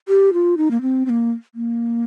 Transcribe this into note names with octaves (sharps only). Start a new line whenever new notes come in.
G4
F4
D#4
A#3
C4
C4
A#3
A#3